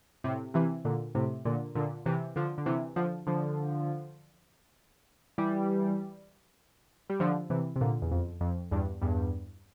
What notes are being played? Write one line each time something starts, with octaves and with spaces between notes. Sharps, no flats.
A2 C3
C3 E3
A#2 D3
A2 C3
A#2 D3
A#2 D3
C3 E3
D3 F3
D3
C3 E3
D3 F3
D3 F3
E3 G3
G3
D3 F3
C3 E3
C3
A#2 D3
E2
F2
F2
E2 G2
E2 G2